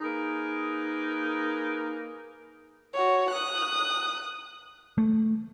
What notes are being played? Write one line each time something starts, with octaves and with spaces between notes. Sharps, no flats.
A#3 D#4 G#4 A#4 B4
F#4 C#5
D#6 F#6
A3